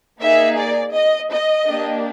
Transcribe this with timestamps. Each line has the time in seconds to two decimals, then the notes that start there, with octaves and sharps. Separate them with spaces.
0.19 A#3 D#4 G#4 E5
0.57 D5
0.93 D#5
1.31 D#5
1.67 A#3 D4 G4